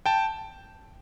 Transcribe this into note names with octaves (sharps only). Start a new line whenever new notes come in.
G5 A5